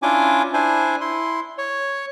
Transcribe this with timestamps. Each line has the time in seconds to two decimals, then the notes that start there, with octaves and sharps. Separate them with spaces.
0.02 C#4 D4 E4 F4 G#5 D6
0.54 D4 E4 C5 G#5
1.01 E4 C6
1.58 C#5